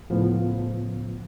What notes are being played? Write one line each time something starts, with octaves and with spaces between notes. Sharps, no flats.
C#2 A2 C#3 F3 B3